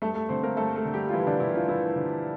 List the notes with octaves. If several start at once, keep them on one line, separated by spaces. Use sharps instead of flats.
G2 A3 A4
A3 A4
D3 C4 C5
A#3 A#4
G2 A3 A4
A3 A4
D3
G3 G4
F4
G2 E3 E4
D3 D4
D3 E3 E4
F3 F4
G2 E3 E4
D3